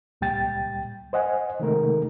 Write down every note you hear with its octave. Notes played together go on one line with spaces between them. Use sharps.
C#2 A#2 G3 G5 A6
C5 D#5 F#5 G#5
C3 D#3 G#3 A3 D#4 A#4